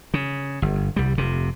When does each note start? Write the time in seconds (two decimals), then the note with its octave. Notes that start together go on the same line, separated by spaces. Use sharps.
0.14 C#3
0.62 G1
0.96 C2 G3
1.18 F1 C3